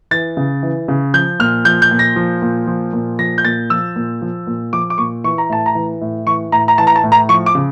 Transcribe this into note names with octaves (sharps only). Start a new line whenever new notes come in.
E3 A6
C#3
E3
C#3
F3 G6
A#2 F6
F3 G6
G6
A#2
A#6
F3
A#2
F3
A#2
F3 A#6
G6
A#2 A6
F3 E6
A#2
F3
A#2
F3 D6
D6
A#2 C#6
E3 C#6
A#5
A2 A5
A#5
E3
A2
E3 C#6
A2 A#5
A#5
E3 A5
A#5
A5
A2
A#5
F3 C#6
D6
C#3